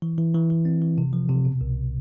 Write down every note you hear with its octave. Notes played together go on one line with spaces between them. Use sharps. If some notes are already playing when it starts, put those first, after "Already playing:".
E3
E3
E3
E3
C4
E3
C3
F3
C3
B2
C2